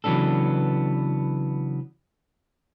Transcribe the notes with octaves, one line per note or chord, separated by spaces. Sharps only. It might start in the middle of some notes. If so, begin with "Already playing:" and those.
C#3 E3 F#3 B3 D4 A4